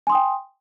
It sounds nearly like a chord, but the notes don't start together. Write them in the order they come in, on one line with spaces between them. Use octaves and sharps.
G#5 C6 D#6 G5